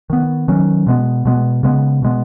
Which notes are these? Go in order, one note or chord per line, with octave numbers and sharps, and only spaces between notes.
D#3 B3
D#3 F#3 C#4
B2 G#3 B3
B2 G#3 B3
C#3 G#3 B3
B2 G#3 B3